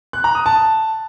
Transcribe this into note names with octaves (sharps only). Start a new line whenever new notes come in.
F#6
A#5
D#6
A5